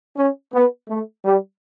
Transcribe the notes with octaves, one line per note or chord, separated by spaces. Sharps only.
C#4
B3
A3
G3